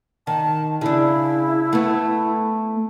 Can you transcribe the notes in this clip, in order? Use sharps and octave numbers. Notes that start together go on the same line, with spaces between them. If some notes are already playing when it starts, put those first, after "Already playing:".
D#3 A5
C#3 D4 E4
A3 B3